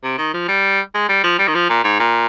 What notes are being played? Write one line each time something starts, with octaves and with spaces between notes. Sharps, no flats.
C3
D#3
F3
G3
G#3
G3
F3
G3
D#3
F3
A#2
G#2
A#2